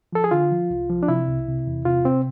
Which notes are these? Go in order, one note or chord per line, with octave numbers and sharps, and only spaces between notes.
F3 A4
G#4
D3 F4
F3
C2
F3
D4
C3 E4
C2
C3
E2
C3 F4
C3 C4